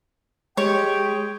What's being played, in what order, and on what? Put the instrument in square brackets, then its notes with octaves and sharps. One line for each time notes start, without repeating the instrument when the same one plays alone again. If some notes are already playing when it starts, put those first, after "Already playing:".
[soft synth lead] G#3 [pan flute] G4 [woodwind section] G#4 G5 [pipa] C#5